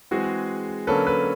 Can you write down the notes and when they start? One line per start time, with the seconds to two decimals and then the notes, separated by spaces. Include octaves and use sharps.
0.11 E3 G#3 C4 F#4 G#4
0.87 D3 F#3 A#3 C#4 A4 B4
1.06 A4 B4